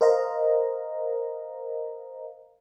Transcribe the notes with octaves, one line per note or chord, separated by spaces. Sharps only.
A#4 C5 D#5 F5 A#5